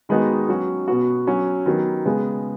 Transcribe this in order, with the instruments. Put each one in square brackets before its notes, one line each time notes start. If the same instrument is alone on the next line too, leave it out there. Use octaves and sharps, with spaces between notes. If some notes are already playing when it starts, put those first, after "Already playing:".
[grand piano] D#3 G#3 B3 D#4 F#4
F#3 C#4 F#4
B2 B3 F#4
F#3 C#4 F#4
D#3 F#3 B3
C#3 G#3 B3